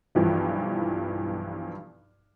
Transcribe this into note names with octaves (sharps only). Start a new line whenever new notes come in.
B1 G2 E3 F3